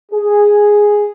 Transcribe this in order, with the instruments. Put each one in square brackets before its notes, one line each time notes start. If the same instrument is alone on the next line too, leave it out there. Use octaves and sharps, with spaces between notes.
[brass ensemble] G#4